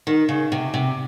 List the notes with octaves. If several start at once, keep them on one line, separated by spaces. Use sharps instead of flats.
D#3
C#3
C3
C3